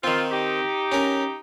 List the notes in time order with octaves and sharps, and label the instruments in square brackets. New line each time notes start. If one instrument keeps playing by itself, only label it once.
[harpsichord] D#3 C4 [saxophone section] F4
[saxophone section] D#4 G4
[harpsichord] C#4 A#4